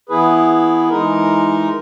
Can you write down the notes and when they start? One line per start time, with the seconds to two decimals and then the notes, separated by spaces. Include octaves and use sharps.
0.09 E3 B3 E4 G#4 B4
0.90 E3 G#3 D#4 A#4